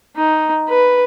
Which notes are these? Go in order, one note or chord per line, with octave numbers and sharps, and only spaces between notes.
D#4
B4